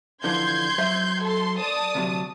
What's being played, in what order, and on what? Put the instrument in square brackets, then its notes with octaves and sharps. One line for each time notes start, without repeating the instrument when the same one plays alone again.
[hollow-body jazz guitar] D3 E3 F3 [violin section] C6 G6 G#6
[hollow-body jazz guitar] F#3 C5 E5
[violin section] A4 C6
D5 A5 D#6
[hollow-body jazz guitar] D2 C3 F#3